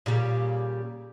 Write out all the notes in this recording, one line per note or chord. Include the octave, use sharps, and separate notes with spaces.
A#2 C#3 G3